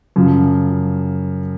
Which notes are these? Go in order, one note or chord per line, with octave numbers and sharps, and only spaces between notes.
F#2 C#3 F3